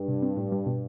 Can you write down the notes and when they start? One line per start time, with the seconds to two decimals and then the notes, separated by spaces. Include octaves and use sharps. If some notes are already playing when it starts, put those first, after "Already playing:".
Already playing: G2
0.08 C3
0.22 C4
0.37 A2
0.52 G3
0.66 B2